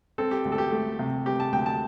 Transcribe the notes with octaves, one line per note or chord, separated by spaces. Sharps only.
C4 A4
G4
D2
A4
G4
A3
C3
C4 G4
A5
D2 G5
A5